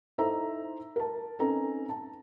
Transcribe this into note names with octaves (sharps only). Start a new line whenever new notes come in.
D#4 E4 A4 C5 E5 A#5
A#4 A5
C4 C#4 D#4 A4 B4 A#5
A5